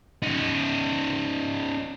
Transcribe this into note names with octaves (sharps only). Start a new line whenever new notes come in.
C#4 D#4